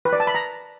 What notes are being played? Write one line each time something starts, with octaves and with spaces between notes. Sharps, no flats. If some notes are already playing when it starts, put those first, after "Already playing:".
B4
D5
A5
B5
A#5